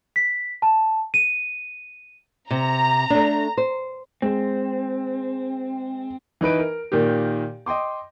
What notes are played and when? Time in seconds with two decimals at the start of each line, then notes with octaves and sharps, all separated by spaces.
0.16 B6
0.62 A5
1.14 D#7
2.51 C3 A#5
3.10 A3 D4
3.57 C5
4.22 G#3 C4
6.41 E3 D#4 B4 D7
6.59 A#4
6.92 A#2 D#3 A#3 G4
7.66 D#5 G5 C6 D6